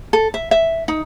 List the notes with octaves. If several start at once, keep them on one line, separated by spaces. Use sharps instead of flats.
A4
E5
E5
D#4